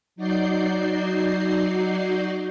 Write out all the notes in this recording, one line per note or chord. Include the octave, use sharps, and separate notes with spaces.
F#3 D#4 F#4 D5 G6 C7